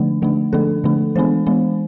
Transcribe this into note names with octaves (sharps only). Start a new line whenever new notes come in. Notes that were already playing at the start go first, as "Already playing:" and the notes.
Already playing: D3 F3 A3 D4
D3 F3 A3 D4
D3 F3 A3 D4 A4
D3 F3 A3 D4
E3 G#3 B3 D4 C5
E3 G#3 B3 D4